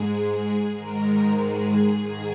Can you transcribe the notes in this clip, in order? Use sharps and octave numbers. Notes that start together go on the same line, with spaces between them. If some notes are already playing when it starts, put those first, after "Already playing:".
Already playing: G#2 G#3 G#4
G#2 D#3 G#3 A#4
G#4
G#2 D#3 G#4